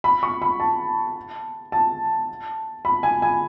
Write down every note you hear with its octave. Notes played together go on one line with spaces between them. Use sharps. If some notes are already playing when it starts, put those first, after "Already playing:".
B5
C#6
B5
A5
A5
B5
G#5
G#5